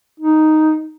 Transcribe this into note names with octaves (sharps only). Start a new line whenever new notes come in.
D#4